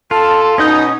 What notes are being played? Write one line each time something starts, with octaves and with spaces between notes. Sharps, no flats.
F4 A4 A5
B2 C#4 D#4 D#5 D#6 G6